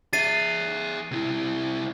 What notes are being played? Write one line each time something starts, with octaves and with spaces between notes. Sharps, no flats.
G#4 E5 A6 C7 D#7
C3 E4